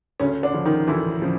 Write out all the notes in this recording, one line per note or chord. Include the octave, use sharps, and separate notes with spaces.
D2 C#3 C#4
D3 D4
C#3 F3
D#3 D#4
D2 E3 E4
C#3 F3